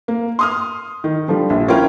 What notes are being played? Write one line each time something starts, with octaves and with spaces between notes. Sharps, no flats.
A#3
C6 D#6 F6
D#3
D3 F3 G3
A#1
C#4 E4 F4 A#4 G5